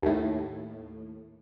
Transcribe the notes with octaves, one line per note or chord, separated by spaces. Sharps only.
D#2 A2